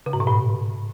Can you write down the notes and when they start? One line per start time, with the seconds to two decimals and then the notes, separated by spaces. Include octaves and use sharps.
0.06 C#3
0.13 G#2
0.20 B2
0.27 A2